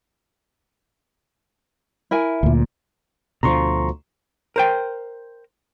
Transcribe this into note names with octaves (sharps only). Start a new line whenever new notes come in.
E4 A#4 G#5
D2 A#2
D2 B2 D3 F3 A#5 C6 C#6
A#4 C5 G5